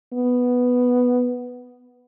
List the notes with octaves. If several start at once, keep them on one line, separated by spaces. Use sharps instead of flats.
B3